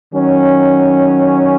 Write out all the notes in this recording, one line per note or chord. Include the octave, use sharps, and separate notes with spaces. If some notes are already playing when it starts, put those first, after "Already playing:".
D#3 F#3 C#4